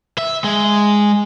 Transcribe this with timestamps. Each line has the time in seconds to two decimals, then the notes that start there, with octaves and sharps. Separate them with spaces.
0.18 E5
0.44 G#3